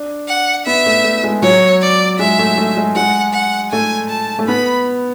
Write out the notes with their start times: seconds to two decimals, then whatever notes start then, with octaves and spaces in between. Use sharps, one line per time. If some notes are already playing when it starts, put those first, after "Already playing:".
Already playing: D4
0.28 F#5
0.66 B3 E5
0.86 A3
1.04 A3
1.23 G#3
1.42 F#3 C#5
1.82 D5
2.19 G#3 E5
2.39 A3
2.58 A3
2.77 G#3
2.95 G#3 F#5
3.34 F#5
3.72 A3 G#5
4.10 A5
4.39 A3
4.48 B3 B5